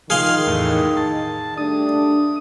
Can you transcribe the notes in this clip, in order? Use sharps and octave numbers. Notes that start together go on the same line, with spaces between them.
D#3 F3 G#4 F5 C6 F6
E2 A2 D#4
A5
G3 A3 D4 D#6